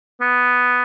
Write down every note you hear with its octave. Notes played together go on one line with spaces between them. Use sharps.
B3